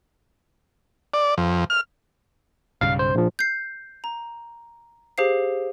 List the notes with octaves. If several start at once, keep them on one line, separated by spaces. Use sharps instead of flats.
D5
F2
F6
B1 G2 C#3 F5
C5
A#1 F3
G6 C7
A#5
G4 G#4 C5 F5 C7